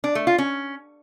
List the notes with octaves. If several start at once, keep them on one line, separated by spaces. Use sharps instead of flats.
D4
A3
F4
C#4